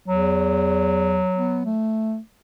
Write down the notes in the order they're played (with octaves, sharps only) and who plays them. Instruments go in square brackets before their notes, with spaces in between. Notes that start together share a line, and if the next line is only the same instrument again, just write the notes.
[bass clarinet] E2 [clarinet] F#3
[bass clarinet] B3
A3